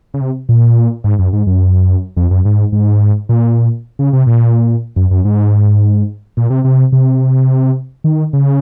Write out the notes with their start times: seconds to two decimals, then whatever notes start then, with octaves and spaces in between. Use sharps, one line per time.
0.14 C#3
0.21 C3
0.49 A#2
1.04 G#2
1.19 F#2
1.33 G#2
1.47 F#2
2.17 F2
2.31 F#2
2.45 G#2
2.72 G#2
3.29 A#2
3.99 C#3
4.13 C3
4.27 A#2
4.96 F#2
5.11 F#2
5.25 G#2
6.37 A#2
6.50 C3
6.64 C3
6.92 C3
8.04 D#3
8.33 C#3